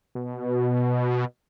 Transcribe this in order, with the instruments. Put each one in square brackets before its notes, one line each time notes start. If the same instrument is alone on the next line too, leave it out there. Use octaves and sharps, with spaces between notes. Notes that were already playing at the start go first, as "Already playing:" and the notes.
[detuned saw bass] B2